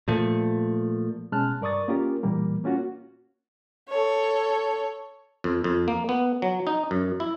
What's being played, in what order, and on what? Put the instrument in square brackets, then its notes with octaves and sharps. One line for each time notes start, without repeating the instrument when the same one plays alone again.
[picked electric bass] A#2 F3 A3
[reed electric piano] B2 G#3 C#4 A5 F6 F#6
G2 A#4 D5 C#6 D#6 A6
A#3 C#4 F4 G4 A#4
A#2 E3 G3 A#3
A#3 C#4 F4 F#4
[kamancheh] A4 C#5
[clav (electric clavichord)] F2
F2
A#3
B3
F#3
D#4
F#2
E4